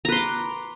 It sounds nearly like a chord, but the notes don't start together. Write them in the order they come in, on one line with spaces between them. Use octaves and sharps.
A#5 B4 C6 D6